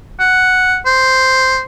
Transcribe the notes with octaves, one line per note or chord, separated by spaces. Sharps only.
F#5
C5